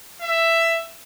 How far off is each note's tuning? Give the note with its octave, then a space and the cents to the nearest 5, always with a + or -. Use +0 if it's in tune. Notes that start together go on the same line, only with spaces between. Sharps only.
E5 +10